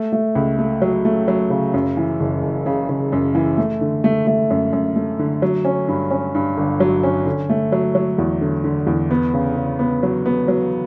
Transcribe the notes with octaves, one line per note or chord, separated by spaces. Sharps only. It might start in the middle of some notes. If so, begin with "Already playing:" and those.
Already playing: A3
A3
C#2
A3
F#3
A3
F#3
C#3
F#2
E3
F#1
F#1
C#3
C#3
F#2
E3
A3
D3
A3
A3
F#2
F#2
A3
D3
F#3
C#4
G2
C#4
G2
G1
F#3
C#4
D3
A3
F#3
F#3
E2
D3
D3
E2
B3
C#3
C#3
B3
F#3
B3
F#3